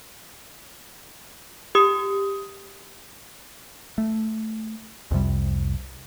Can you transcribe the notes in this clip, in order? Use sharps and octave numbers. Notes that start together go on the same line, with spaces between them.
G4 D#6
A3
C2 F2 C3 G3